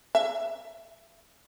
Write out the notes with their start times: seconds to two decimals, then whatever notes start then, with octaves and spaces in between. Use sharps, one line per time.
0.15 E5